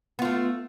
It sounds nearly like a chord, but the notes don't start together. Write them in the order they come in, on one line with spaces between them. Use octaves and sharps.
B3 F4 A3